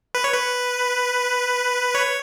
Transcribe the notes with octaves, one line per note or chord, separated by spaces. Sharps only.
B4
C#5
B4
C#5